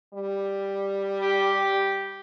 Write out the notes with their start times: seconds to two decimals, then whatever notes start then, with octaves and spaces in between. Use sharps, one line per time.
0.14 G3
1.21 G4